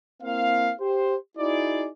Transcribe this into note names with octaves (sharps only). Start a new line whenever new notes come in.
A#3 C4 E4 F5
G4 C5
D#4 E4 F#4 G#4 D5